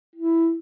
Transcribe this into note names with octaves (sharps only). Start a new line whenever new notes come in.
E4